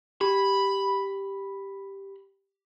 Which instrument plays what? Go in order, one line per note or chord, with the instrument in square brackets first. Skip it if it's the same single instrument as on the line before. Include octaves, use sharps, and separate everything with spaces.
[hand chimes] G4 [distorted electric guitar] B5